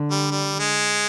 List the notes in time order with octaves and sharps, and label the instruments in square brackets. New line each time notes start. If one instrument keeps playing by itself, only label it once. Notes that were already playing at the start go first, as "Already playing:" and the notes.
Already playing: [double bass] D3
[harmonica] G3
G3
G#3